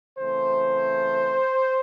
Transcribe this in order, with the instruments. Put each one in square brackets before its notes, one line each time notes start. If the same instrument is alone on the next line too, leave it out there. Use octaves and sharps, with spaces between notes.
[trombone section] C#3 E3 A3 C4 C5